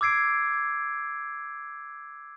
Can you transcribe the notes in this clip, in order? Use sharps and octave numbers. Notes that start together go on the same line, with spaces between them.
D6 E6 G#6 C7 D7